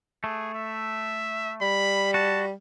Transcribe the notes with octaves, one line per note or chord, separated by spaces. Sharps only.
A3 G#4
E5
G3 B5
F#4 A5